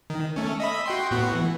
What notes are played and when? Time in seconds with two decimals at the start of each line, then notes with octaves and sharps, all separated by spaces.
0.10 D#3
0.36 A3 C#4
0.60 D#5 E5 B5
0.86 F#4 G5 C6
1.11 A2 B3 F#4
1.35 E3